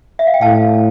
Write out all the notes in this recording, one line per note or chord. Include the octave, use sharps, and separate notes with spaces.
E5
F5
G5
A2 F5 A5